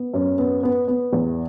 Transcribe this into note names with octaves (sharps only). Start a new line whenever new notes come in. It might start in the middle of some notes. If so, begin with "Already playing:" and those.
Already playing: B3
F#2
B3
B3
B3
E2